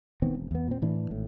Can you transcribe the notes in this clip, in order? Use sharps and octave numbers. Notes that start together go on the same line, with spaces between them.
E1 D#3 B3 C4
E1
E2 B3
A#2 C4
A2 E3 D4
G#1 A2